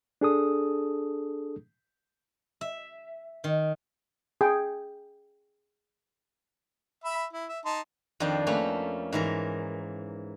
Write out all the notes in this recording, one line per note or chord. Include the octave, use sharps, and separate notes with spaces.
D4 G#4 A4 D#6
E5
D#3
G#4 G5
E5 B5
E4
E5
D#4 A5 C6
F2 D#3 D4 D5 F5 G5
A3 A#3 C#4 B4
G#2 E3 A#4